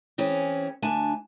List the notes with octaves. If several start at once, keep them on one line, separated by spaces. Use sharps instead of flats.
E3 C4 C#4 G#4
D2 D4 G#5 A5